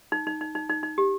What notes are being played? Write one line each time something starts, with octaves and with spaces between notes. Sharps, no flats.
D#4
D#4
D#4
D#4
D#4
D#4
G4